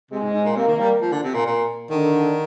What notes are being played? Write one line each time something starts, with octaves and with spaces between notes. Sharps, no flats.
C3 G#3
G#2
G#2
A#2
C3 A#3
D#3
G3
F3
D3
C3
A#2
A#2
D3 D#3